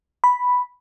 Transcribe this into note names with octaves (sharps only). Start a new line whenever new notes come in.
B5